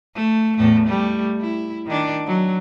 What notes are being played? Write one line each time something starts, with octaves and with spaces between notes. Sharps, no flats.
A3
E2 A2 A3
G3 A3
E4
D#3 D4
F#3